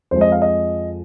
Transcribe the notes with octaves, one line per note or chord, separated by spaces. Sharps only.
F2 F3 G#3 C5
D#5
F5
D#5